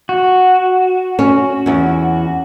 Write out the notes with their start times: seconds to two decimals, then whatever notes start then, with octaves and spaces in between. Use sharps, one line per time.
0.09 F#4
1.19 C#4
1.66 E2 C#4